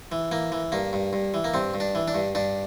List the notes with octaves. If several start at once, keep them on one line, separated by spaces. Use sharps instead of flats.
E3
E3 A#3
E3
G2 A#3
G2
G2
E3
A#3
G2 C4
G2
D4
E3
D4
G2
G2 D4